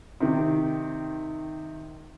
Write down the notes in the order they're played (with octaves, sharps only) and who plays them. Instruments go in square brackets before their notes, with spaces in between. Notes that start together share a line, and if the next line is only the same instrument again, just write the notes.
[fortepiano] C3 D#3